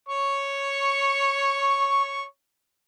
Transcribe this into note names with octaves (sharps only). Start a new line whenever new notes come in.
C#5 C#6